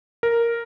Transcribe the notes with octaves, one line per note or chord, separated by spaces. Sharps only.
A#4